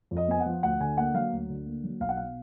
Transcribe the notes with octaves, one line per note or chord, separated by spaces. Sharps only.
F2
D#5
B3 G#5
F#5
F3
D2 F#5
D3 G#5
A#3 F#5
F#3 F5
D2
D3
A#3
F#3
B1 F5
F#5
B2 F5